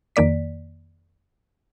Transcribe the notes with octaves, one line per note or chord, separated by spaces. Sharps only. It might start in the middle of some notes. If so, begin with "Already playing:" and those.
F2 D#3 A#3 D5 B6